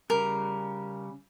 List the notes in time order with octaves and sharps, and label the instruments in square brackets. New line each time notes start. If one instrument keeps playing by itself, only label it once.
[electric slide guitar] C#3 G3 [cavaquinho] A#4